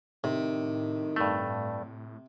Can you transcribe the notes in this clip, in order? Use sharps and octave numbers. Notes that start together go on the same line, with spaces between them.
A2 C3 D#3
G2 A3